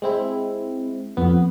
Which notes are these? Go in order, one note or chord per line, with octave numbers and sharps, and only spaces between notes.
G#3 C4 E4
F2 B3